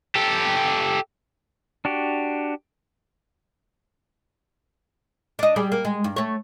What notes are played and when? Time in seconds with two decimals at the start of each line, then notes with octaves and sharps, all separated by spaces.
0.16 G4 A4
1.85 D4 F#4 G4
5.39 D4 D#5
5.56 G3 G#4 D5
5.72 A#3
5.85 G#3
6.04 G2
6.16 A3 C#5